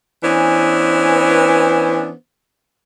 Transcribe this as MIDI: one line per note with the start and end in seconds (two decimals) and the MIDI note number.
0.24 2.12 52
0.24 2.12 59
0.24 2.12 61
0.24 2.12 62
0.24 2.12 72